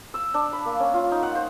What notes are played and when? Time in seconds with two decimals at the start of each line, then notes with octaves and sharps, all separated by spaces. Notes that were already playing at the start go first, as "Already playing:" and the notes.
0.14 E6
0.34 D4
0.53 B5
0.65 A#3
0.80 C#4
0.94 F4
1.12 D#4
1.23 F#5
1.35 C5